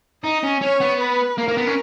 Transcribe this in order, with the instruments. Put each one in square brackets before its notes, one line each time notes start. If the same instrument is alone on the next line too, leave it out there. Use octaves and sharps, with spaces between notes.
[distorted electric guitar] D#4 [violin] D#5
[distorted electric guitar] C#4
[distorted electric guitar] C#4 [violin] C#5
[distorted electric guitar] B3
[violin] B4
[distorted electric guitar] A#3 [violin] A#4
[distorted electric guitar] A#3
B3
C#4